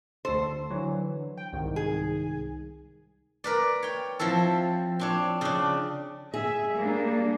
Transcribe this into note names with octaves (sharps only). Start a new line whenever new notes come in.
D2 A4 C5
D3 E3 F#3
G5
C2 G#2 D#3
G#4
A#4 B4 D5
C#5 G5
F3 C4 E4 A4
C4 D4 C#5
C#3 D4
G#4 E5
G3 A#3 D4